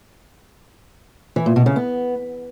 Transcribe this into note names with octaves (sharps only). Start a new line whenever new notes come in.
E3
A#2
B2
C#3
B3